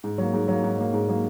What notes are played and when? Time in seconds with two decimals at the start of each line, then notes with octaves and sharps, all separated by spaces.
0.04 G#2
0.18 F#3 A#3
0.33 G#2
0.48 F#3 A#3
0.63 G#2
0.78 F#3 A#3
0.93 G#2
1.08 F#3 A#3